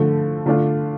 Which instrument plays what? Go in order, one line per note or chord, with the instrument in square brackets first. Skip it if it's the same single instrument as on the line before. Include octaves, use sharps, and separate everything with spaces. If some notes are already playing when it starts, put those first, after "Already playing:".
Already playing: [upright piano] D3 F3 A3
D3 A3 D4 F4